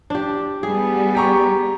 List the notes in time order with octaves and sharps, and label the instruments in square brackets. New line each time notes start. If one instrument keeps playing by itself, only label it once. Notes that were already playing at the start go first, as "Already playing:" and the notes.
[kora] D4 G4
[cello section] G3 B3 [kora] G#4
[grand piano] G4 A#5 C#6